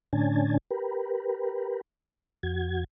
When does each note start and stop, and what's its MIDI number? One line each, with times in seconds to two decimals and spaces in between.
0.13 0.57 45
0.13 0.57 50
0.13 0.57 61
0.13 0.57 62
0.13 0.57 80
0.13 0.57 81
0.71 1.81 67
0.71 1.81 70
0.71 1.81 71
2.43 2.84 41
2.43 2.84 66
2.43 2.84 92